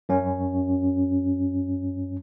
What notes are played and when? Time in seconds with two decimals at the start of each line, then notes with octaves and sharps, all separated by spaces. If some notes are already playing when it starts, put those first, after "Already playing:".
0.09 F#2 C#4